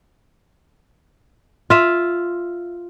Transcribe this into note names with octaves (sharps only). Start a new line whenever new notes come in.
F4 E5